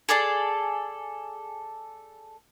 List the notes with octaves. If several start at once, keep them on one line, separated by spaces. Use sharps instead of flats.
G#4 A4 D5 A5